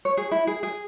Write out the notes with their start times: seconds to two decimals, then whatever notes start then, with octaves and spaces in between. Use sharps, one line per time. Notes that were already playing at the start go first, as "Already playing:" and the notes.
0.05 C#5
0.17 G#4
0.31 E4
0.47 G#4
0.63 G#4